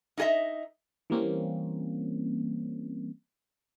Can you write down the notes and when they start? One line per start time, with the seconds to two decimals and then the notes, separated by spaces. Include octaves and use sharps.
0.17 D#4 F4 G#4 D#5 E5
1.10 E3 G3 A#3 C4 C#4